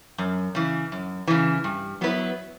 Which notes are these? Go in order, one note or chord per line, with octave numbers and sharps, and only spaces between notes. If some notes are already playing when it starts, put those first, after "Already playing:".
F#2
C#3 E3
F#2
C#3 E3
G2
F#3 B3 E4 B4